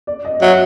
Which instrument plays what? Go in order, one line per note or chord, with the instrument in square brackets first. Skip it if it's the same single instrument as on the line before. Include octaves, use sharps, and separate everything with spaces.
[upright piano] D5
D#5
[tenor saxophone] F#3 [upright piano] E5